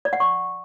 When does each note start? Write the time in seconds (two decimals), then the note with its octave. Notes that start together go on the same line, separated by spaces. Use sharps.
0.05 D5
0.13 F#5
0.20 C#6